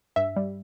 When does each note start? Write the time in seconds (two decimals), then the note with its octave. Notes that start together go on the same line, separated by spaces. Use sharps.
0.16 G2 E5
0.36 G3